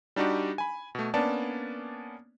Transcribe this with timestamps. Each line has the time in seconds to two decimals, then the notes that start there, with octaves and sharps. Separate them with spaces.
0.16 G3 D4 D#4 F#4 G4
0.58 G#5 B5
0.95 B2 A3
1.14 A#3 B3 C#4 D4 D5 A5